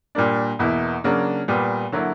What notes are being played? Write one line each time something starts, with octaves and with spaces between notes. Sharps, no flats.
A#2 G3 A#3 D4
E2 B2 A#3 E4
C#3 F#3 A#3 D4
A#2 G3 B3
D3 F#3 A#3 E4